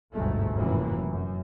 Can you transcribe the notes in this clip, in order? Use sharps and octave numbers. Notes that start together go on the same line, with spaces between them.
G1 D2 G#2 B2 G#3 A3
F1 F#2 A2 E3 A#3
F#2